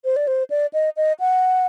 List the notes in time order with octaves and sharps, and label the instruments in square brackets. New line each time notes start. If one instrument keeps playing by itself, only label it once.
[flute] C5
D5
C5
D5
D#5
D#5
F#5